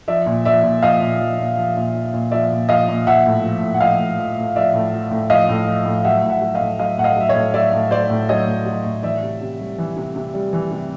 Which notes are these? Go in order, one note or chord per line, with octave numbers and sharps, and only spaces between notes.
F3 D5 E5
A#2
F3 D5 E5
A#2
F3 D#5 F5
A#2
F3
A#2
F3
A#2
F3
A#2
F3 D5 E5
A#2
F3 D#5 F5
A#2
F3 E5 F#5
A2
F3
A2
F#5
F3 D#5 F5
A2
F3
A2
F3 D5 E5
A2
F3
A2
F3 D#5 F5
A2
F3
A2
F#3 E5 F#5
A2
E5 F#5
F#3
D#5 F5
A2
F#3 D#5 F5
A2 F#5
D#5 F5
F#3 E5
C#5 D#5
A2
F#3 D5 E5
A2
F#3 C5 D5
A2
F#3 C#5 D#5
A2
F#3
A2
E3 D5 E5
C3
C3
G3
E3
C3
C3
G3
E3
C3